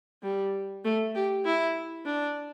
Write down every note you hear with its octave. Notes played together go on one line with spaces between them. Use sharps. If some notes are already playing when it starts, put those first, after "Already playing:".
G3
A3
G4
E4
D4